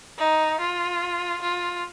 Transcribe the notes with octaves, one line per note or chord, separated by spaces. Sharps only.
D#4
F4
F4